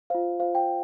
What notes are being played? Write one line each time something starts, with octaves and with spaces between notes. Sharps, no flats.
F4 C5 F5
F4 C5 F5
G5